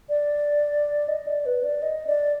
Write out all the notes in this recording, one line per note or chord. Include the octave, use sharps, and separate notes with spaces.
D5
D#5
D5
B4
D5
D#5
D5